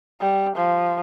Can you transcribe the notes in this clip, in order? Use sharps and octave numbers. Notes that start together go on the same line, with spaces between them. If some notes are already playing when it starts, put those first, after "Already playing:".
G3
F3